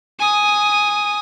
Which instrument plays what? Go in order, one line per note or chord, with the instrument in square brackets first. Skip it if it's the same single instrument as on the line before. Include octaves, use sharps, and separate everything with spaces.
[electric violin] G#5 D#6